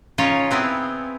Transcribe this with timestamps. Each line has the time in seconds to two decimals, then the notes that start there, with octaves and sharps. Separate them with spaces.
0.18 C#3 C#4 D#4 F4 C#5
0.51 B3 C4 E4 G#4